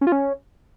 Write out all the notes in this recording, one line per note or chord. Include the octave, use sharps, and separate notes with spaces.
C#4
F4
C#4